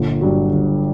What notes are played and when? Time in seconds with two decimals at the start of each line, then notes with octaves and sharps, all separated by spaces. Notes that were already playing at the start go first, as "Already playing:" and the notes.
Already playing: G1 A#2
0.21 G2 F#3
0.53 G1